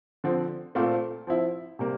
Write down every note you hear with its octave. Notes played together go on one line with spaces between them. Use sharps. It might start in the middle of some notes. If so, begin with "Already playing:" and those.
D3 F3 C4
A#2 A3 C4 F4 C5
F3 C4 E4
C3 G3 A#3